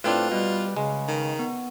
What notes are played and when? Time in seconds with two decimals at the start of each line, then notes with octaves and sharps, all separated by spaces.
0.04 A2 C4 D4 F4 B4
0.32 B2 G3
0.77 C#3 G#3
1.08 D#3
1.39 B3